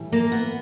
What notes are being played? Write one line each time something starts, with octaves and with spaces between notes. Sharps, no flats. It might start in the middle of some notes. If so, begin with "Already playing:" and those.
Already playing: A2 E3 G3
A#3
B3